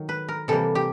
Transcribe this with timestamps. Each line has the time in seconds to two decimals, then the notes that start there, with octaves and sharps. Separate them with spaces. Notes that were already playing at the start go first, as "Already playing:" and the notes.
Already playing: D#3 F#3
0.09 B4
0.29 A#4
0.48 C3 E3 G3 A#3 A4
0.75 G4